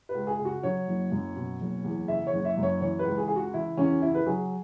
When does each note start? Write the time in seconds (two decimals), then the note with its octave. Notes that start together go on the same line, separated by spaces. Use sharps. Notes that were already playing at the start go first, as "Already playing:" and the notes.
0.09 B4
0.15 C#2
0.27 G#4
0.39 C#3
0.45 F#4
0.63 F#3 C#5
0.88 F#1
1.12 F#2
1.36 B2
1.61 F#1
1.84 E2
2.08 C#3 E5
2.27 C#5
2.33 F#1
2.45 E5
2.57 F#2
2.63 C#5
2.81 E3 C#5
2.99 B4
3.05 C#2
3.18 G#4
3.28 C#3 G#4
3.36 F#4
3.54 E3 E4
3.77 E2 C#4
4.02 C#3 E4
4.15 B4
4.26 F#3 G#4